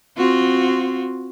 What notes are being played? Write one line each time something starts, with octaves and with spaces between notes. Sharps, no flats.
C4 F4 F#4